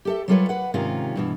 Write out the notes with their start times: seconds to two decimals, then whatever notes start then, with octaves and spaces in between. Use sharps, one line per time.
0.05 G4 A4 E5
0.28 F#3 G3 F4 A4 B4 C#5
0.49 B4 F#5
0.74 G#2 C3 D#3 C#4 F4
1.16 G2 B2 E3